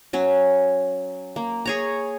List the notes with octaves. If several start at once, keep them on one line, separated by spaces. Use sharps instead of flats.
F#3 C#4
A#3
G#4 C#5 A#5